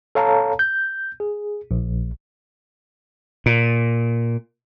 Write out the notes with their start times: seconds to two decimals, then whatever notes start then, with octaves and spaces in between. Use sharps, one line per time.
0.15 A4 C#5 F5 A5 A#5
0.59 G6
1.20 G#4
1.71 A#1
3.46 A#2